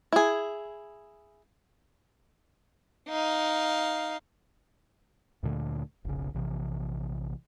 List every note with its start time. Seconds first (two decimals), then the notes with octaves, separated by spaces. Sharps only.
0.12 E4 G#4
3.09 D#4 F5
5.43 D2 A#2 D3 A3
6.05 F1 B1 C#3
6.34 A#1 C3 E3